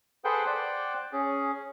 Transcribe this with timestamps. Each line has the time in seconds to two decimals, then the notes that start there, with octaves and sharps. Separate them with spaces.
0.24 G#4 A4 B4 C5 F#5 G5
0.47 C5 D5 F#5 G5 D6
1.12 C#4 G#4